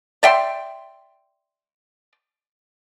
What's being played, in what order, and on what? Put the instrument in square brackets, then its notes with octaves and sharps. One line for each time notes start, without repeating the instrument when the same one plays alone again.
[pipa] D5 E5 G5 C6